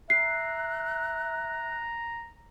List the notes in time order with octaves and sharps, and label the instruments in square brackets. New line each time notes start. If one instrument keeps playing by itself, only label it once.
[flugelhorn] E5 [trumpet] A#5 [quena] F#6 [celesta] C7